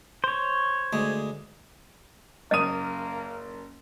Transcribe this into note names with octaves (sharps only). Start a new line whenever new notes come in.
C5 C#5
D2 G#3
F#1 A#3 D#5 D#6 D#7